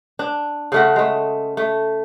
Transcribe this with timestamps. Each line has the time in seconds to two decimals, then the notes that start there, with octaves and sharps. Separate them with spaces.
0.19 D4
0.72 C#3 A3 F#4
0.96 G#3 A3
1.57 A3